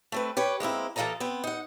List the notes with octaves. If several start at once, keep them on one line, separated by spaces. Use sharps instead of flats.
A3 C4 B4
G4 B4 C#5
G#3 A#3 C4 E4
E3 A#3 F4 A4 D#5 A#5
B3 C4
D#4 F#5